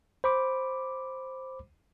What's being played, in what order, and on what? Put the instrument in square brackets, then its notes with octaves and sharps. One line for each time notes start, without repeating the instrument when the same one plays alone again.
[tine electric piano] C5 B5 D6